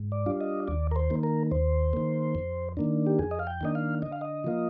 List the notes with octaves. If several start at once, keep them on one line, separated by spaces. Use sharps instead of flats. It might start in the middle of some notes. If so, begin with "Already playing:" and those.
Already playing: G#2
D5
G3 D4 F4
D#5
D#2 D5
A#4
C5
D#3 A#3
A#4
D#2 C5
D#3 A#3
F2
D#3 A#3 D4
G4
F2 G#4
D#5
F5
G5
D#3 A#3 D4 D#5
F5
D3 D#5
F5
D#5
F3 A#3 F4